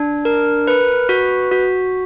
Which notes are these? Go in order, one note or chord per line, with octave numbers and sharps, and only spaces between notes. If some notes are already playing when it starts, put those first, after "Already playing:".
Already playing: D4
A#4
B4
F#4
F#4